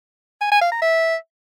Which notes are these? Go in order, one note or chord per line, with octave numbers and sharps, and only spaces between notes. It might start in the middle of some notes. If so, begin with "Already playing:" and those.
G#5
G#5
F5
A#5
E5